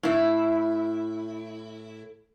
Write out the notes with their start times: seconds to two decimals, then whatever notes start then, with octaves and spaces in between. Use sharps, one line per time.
0.03 A2 E4